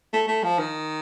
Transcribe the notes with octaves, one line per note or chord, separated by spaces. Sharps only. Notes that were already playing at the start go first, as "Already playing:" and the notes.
A3
A3
F3
D#3